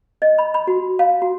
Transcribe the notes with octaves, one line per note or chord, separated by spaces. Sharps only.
D#5
B5
B5
F#4
F5
F#4